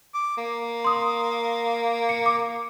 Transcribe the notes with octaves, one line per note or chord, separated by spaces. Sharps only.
D6
A#3
C6 D#6
C#7
D6